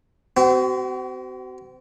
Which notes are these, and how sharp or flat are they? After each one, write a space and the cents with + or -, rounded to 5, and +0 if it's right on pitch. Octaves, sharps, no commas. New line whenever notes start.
C4 -35 F#4 +35